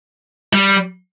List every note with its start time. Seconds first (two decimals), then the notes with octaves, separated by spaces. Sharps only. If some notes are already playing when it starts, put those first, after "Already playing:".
0.53 G3